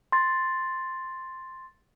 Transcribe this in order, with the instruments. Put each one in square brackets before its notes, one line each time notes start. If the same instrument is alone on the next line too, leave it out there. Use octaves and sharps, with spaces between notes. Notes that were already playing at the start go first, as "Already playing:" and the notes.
[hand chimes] C6 A6